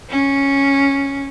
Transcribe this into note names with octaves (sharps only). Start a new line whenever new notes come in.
C#4